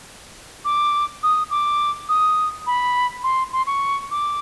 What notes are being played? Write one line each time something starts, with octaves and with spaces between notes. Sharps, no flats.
D6
D#6
D6
D#6
B5
C6
C6
C#6
D6